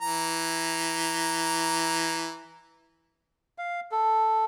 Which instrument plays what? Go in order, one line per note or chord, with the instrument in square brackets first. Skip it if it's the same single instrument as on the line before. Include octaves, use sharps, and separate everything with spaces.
[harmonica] E3 A#5
[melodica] F5
A4